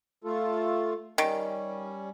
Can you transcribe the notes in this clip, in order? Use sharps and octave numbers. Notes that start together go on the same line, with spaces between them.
A3 F4 A4
D#3 G3 C#4